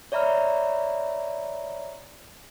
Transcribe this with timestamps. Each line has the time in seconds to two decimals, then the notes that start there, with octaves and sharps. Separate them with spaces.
0.12 C#5 D5 E5 A#5 B5 F6